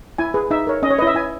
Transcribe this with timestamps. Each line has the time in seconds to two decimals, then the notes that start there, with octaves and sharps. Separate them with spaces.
0.18 E4 G#5
0.34 G#4 B4
0.51 D#4 E5
0.67 A#4 C#5
0.83 C#4 D#5
0.90 C#5
0.98 B4 D#5
1.02 E4
1.07 E5
1.15 E4 G#5